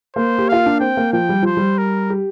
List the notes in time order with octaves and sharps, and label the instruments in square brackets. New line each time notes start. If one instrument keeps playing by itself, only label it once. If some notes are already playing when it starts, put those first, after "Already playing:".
[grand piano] A#3 [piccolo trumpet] C5
[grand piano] G4
[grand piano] F4 [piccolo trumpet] F5
[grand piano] D4
[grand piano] C4 [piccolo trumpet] G5
[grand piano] A#3
[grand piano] F3 [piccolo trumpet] G5
[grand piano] G3
[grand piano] F3 [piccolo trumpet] C5
[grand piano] G3
[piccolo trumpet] A#4
[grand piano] G4